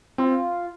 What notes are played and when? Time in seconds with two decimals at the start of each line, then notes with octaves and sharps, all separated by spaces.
0.18 C4 F4